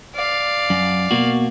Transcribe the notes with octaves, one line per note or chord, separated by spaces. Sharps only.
D5 F5
F#2
B2 A#3 F#4